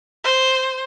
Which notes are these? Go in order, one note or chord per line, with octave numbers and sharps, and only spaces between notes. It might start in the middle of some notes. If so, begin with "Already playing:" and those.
C5